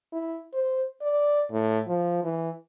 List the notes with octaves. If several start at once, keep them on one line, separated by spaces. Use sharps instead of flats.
E4
C5
D5
A2
F3
E3